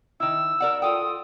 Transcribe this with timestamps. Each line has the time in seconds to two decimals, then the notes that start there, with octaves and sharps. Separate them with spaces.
0.20 D#3 E4 E6
0.60 A#4 D5 F#5
0.82 F4 A4 G5 D#6